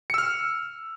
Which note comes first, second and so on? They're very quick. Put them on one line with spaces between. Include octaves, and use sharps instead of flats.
C#7 E6 F6